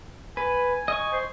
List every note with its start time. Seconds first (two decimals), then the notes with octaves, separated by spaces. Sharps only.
0.37 B4 G#5
0.88 D#5 C#6
1.12 C5